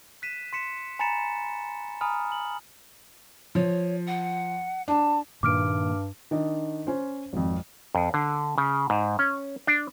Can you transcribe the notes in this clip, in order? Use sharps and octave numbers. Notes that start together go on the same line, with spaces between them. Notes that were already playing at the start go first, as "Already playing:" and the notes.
F#6 B6 D#7 E7
C6 B6 C#7 E7
G#5 A#5 B5 A6 C#7 E7
G#5 A#5 B5 D#6 F6
F#7
F3 C#5
F#5
D4 A5
G2 A#2 D#3 A#3 D6 F6 D7
D#3 D4 D#5
C#4 C5
G#1 F2
F2
D3
C#3
G#2
C#4
D4